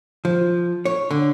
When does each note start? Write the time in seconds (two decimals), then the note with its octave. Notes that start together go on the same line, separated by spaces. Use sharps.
0.25 F3
0.85 C#5
1.11 D3